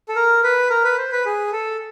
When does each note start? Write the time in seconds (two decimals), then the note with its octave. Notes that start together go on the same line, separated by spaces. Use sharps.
0.08 A4
0.16 A#4
0.44 B4
0.70 A#4
0.84 B4
0.98 C5
1.12 B4
1.26 G#4
1.52 A4